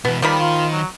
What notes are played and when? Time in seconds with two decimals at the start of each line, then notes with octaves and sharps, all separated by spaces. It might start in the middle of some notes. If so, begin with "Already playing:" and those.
0.05 B2 E3 B3
0.22 D#3 F3 G3 A#3 B5
0.40 F4
0.73 F#3